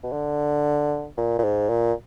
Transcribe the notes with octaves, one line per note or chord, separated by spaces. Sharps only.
B2
D3
A#2
A#2
G#2
A#2